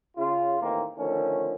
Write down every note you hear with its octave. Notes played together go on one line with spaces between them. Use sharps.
C#3 F4
D#2 A2 D#3 E3 A#3 C4
D3 D#3 F3 A3 C#4